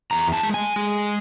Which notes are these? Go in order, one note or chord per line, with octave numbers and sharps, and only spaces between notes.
E2 A#5
A5
G#3
G#5
G#3